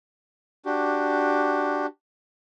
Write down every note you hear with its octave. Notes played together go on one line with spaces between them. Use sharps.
D4 F#4 G4